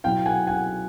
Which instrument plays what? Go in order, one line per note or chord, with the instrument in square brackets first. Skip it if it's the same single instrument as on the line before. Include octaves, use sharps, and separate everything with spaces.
[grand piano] B2 F#3 B3 E4 F5 G5
F#5 G#5
F#5 G#5